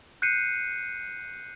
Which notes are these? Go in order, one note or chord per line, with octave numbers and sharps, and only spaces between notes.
F#6 G6 C7 C#7 D#7